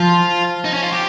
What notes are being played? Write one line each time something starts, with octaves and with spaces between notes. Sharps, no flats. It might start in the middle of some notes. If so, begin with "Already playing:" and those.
Already playing: F3 F4
D#4
C#4
F4
G4